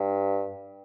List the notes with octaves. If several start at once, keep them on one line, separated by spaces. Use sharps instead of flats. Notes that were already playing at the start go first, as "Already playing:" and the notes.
Already playing: G2